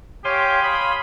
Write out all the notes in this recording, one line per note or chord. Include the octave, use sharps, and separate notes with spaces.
G4 C#5 F5 G#5 C6
B5 D#6